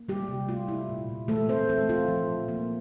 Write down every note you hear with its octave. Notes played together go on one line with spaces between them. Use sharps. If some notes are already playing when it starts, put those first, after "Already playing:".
Already playing: A#3
G3 G4
C3
A3 F4
E4
A#2
A#2
E3 A3 A4
A3 C4 C5
E3 A3 A4
E3 F4
F3
A#2
A#3